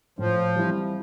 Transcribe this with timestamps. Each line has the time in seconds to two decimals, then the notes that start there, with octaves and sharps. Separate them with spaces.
0.19 A2 F3
0.55 E3 G3 C4 E4